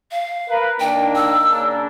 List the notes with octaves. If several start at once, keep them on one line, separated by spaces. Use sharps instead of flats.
F5
A#4 B4
D#3 A#3 D4 G5
E6
C#3 A#3 D4